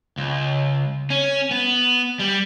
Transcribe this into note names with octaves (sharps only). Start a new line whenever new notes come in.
C#2
C#4
B3
G3